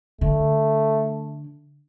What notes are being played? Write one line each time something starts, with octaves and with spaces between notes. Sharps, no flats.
D3 A3